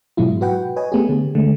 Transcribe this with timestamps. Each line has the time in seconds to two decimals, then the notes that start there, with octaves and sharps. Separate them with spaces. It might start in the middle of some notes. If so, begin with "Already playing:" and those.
0.17 G#2 B2 F#3 G#3 E4 F4
0.41 F#4 B4 F#5 G5
0.76 B4 C#5 D#5 G#5
0.92 A3 B3 G4 G#4
1.09 D3
1.35 D3 G#3 A3